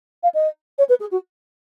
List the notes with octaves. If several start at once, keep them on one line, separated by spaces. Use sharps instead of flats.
F5
D#5
C#5
B4
G#4
F#4